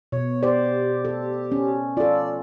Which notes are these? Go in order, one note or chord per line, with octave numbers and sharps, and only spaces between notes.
B2 C#5
G4 C5 D5
A4
C#4
F4 A4 D5